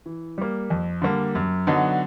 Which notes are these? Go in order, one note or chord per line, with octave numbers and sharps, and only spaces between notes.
E3
G3 A#3
F2
D3 G3 A#3
F#2
D3 F#3 B3 D#4